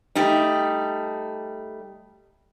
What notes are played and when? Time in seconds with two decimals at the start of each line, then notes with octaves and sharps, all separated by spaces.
0.15 G3 A3 D#4